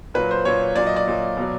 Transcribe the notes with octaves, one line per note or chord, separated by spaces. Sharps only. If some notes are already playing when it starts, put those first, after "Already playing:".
A#2 F#3 B4
C5
A#2 F#3 C#5
A#2 F#3 D5
D#5
D5
A#2 F#3
B2 F#3